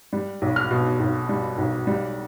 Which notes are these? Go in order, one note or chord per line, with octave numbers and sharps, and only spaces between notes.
G3
B1
F6
B2
B1
G3
B1
G3